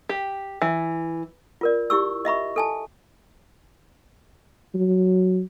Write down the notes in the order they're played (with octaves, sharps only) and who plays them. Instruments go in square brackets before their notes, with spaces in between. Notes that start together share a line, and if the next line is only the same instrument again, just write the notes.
[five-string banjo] G4
E3
[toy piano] F4 A#4 D5
E4 G4 C#6 E6
D#5 E5 B5 C#6
A4 G#5 A5
[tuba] F#3